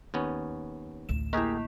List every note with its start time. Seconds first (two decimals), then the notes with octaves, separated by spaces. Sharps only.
0.14 D#2 B3 C#4
1.09 A1 D2 E7
1.33 A#3 E4 G4 G#4 A#4